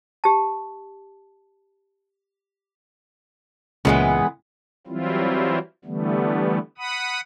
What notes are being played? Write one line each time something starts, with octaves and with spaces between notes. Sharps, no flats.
G4 A5
C#2 A#2 C#3 E3 G#3 B3
E3 F#3 G3 C4 E4 F4
D3 E3 G3 A3 B3
F#5 B5 D#6